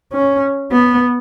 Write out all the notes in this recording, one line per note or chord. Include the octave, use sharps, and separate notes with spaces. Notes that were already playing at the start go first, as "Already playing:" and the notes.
C#4
B3